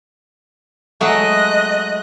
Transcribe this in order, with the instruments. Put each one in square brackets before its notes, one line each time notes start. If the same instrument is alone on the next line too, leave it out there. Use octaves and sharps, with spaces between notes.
[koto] F#3 G#3 A3 [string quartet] D#5 F#6